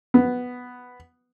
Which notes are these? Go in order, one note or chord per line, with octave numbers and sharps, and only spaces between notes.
B3